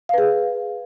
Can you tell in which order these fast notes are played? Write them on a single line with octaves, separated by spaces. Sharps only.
F5 B4 G#4